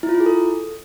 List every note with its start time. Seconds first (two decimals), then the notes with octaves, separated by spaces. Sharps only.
0.03 E4
0.09 F4
0.15 E4
0.20 G#4
0.26 A4